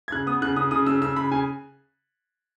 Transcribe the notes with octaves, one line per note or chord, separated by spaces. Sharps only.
G#6
C#3 F#6
B3 D#6
C#3 F#6
C#3 D#6
C#3 D#6
C#3 E6
C#3 E6
C#3 B5
C#3 G#5